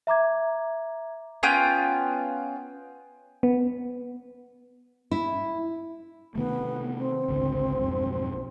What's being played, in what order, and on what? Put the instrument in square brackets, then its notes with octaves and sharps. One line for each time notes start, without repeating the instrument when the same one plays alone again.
[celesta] E5 A#5 D6 G#6
[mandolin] B3 C#4 F4 G5
[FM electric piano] B3
[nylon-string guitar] E4
[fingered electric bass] C3 D#3 A3 [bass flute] B3
[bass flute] C4
[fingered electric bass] G#1 C#2 D3
B1 F2 G#2